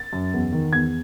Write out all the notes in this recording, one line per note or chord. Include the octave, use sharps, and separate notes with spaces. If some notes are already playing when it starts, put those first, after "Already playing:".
Already playing: A6
F#2
E2
D#3
E2 G#6